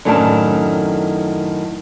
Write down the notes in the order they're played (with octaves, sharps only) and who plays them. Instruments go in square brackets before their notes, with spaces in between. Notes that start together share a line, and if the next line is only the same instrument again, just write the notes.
[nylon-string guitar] F#2 A2 D#3 D4 G5 A5